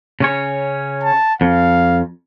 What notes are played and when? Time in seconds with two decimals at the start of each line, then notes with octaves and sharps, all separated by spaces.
0.20 C#3 C#4 C#5
1.03 A5
1.41 F2 F5